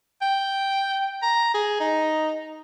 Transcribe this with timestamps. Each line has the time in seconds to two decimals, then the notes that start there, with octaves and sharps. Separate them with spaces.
0.21 G5
1.22 A#5
1.54 G#4
1.80 D#4